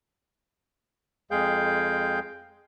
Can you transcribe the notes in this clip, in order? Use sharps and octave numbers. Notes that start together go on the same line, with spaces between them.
F2 G#3 G#4 F5 G5 G6